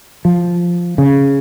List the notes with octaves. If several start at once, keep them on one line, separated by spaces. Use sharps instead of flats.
F3
C#3